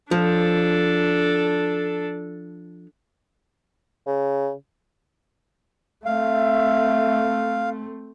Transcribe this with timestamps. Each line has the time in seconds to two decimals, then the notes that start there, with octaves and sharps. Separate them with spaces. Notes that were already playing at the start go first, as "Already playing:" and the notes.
0.11 F3 D4 A4
4.07 C#3
6.05 A3 C4 E5 F5